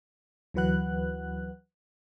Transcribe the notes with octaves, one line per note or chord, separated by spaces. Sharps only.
D2 E3 F#3 B4 F#5 F#6